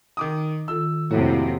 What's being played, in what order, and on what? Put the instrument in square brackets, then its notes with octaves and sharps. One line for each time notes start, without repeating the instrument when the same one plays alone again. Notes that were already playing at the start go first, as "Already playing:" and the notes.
[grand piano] D#3 D6 D#6
[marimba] D#3 F4 A4 [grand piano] E6
[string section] F2 C3 [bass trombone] A2 [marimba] A3 A#3 [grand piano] F#4